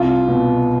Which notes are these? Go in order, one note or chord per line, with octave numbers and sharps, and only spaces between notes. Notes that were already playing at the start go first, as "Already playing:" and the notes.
Already playing: C2 F4
B2